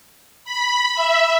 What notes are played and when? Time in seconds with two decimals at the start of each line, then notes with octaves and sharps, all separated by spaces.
0.45 B5
0.95 E5